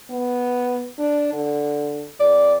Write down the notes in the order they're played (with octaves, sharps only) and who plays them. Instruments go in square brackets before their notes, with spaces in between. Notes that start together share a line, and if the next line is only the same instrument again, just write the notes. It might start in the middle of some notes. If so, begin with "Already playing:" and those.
[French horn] B3
D4
D3
[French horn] F2 [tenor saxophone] D5